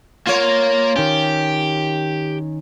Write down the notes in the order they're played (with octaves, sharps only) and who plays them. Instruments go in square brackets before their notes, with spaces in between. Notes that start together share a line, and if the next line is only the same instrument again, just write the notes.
[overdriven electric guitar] A#3 A#4 [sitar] F4 C#5
[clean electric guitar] D#3 C#4 [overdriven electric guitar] G4